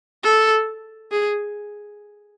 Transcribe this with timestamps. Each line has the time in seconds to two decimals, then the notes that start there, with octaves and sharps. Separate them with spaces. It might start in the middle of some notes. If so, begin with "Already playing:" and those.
0.23 A4
1.12 G#4